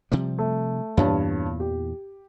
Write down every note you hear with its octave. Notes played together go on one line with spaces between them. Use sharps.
C3 F3 G3
A3
E2 G2 A#2 E3 C#5 A5
G4